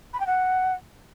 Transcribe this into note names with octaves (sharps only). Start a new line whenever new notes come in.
B5
G5
F#5